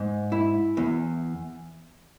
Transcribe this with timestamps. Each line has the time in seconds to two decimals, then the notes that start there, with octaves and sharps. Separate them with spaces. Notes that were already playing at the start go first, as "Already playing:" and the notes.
Already playing: G#2
0.32 E4
0.77 E2